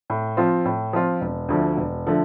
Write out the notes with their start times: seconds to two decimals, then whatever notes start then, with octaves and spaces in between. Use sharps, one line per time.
0.10 A2
0.37 F3 C4 F4
0.65 A2
0.93 F3 C4 F4
1.21 E1
1.49 D2 D3 F3 A3
1.77 E1
2.07 D3 F3 A3